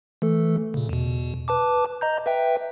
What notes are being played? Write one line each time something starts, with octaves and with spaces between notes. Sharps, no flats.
E3 A3 A4
A#2 C#3
E2 B2
B4 A5 D6
D#5 A#5 G6
B4 E5 G5